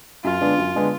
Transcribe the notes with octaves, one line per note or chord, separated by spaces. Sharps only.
F#2 F4
D3 G#3 B3 D4
F#2
D3 G#3 B3 D4